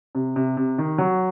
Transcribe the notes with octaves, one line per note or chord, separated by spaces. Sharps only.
C3
C3
C3
D#3
F#3